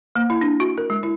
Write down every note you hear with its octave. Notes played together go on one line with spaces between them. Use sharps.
A#3
E4
D4
F#4
A#4
G#3
E4